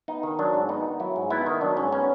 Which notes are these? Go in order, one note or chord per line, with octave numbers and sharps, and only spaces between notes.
B3 D#4
D#3
F#3 D4
G#2
B3 D#4
D#3
F#3 E4
G#2
B3 E4
D#3 D#4
F#3 D4
G#2 C#4
B3 C#4